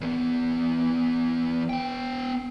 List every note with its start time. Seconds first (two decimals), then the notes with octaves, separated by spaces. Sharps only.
0.01 E2 B3
1.70 B3 G5